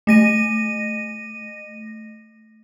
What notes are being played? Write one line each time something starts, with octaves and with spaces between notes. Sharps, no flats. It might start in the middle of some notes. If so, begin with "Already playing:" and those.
A3 A#6 D#7